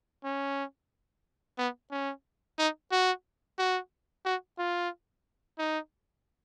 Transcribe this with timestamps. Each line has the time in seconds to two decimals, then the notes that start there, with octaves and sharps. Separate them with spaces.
0.24 C#4
1.58 B3
1.91 C#4
2.58 D#4
2.92 F#4
3.59 F#4
4.25 F#4
4.59 F4
5.59 D#4